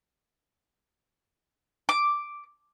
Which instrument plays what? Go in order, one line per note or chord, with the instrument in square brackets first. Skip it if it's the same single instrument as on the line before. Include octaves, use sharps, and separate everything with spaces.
[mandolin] D6